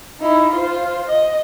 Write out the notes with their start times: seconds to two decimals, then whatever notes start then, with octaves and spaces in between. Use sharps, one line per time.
0.20 D#4 E4
0.51 F4 C5
1.08 D#5